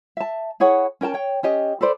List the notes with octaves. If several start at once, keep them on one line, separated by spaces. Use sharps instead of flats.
E5 A5
E4 G#4 C#5 F#5
C#4 A#4 G5 A5
C#5 G5
C#4 G4 D#5
A4 B4 C5 D5